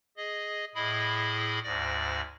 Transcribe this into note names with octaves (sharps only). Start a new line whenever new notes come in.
G#4 D#5
A2 E4 G#4 D#5 B5
D2 G#2 D5 A#6